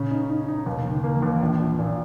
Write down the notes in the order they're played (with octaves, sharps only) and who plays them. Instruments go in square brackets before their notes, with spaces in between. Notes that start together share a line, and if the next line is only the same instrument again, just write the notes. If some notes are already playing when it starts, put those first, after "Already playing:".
Already playing: [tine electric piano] A#2 [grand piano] C#3 C#4
[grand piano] D#4
D#4
D#4
[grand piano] D#2 [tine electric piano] B2
[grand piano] D#3
[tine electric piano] C#3
[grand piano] A#3
[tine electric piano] E3
[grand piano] D#2
A#1
A#1
A#2